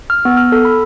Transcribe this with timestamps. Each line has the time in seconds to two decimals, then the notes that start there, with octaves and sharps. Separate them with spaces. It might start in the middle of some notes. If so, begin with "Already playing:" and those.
0.10 F6
0.25 B3
0.37 F6
0.52 A4
0.65 B5